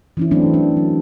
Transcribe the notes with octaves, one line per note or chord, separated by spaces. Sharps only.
E3 C#4 E4
E3 F#3 A3 C4 D4
D4
F#3